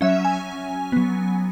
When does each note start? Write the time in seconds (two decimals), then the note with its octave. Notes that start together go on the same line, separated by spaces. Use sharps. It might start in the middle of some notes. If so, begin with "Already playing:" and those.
0.01 F#3 C#4 E5
0.25 G#5
0.92 F#3 B3